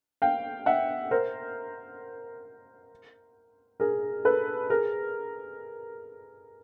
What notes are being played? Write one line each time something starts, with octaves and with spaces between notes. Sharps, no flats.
F5 G5
E5 F#5
A#4 C5
G#4 A#4
A4 B4
G#4 A#4